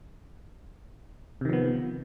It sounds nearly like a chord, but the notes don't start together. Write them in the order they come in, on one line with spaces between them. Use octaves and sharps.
C3 D#3 F3 B3